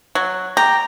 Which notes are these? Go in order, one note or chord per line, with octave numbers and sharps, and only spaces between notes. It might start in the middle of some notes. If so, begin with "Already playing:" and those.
F#3
G4 A#5